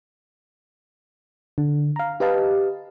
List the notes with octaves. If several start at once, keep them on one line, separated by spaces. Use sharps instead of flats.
D3
F5 A#5
G4 B4 D#5 F5 A5